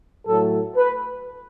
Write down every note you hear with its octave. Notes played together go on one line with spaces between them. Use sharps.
A2 F#3 A3 A4
B4